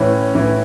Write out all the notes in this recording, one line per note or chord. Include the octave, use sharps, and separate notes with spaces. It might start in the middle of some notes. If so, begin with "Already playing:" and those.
Already playing: A2 E3 C#4
A2 E3